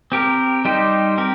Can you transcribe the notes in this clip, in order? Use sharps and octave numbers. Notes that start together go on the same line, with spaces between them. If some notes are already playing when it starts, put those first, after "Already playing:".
C4 G4 A#4
G3 D#4 G4 C5
C4 G4 A#4